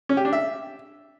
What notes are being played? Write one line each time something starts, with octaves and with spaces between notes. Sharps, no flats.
C#4
G4
D4
E5